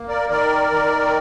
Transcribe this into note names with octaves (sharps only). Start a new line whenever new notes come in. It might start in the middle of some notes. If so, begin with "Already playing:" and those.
Already playing: A#3
A#4 D5
D#3 A#4 D5
D#3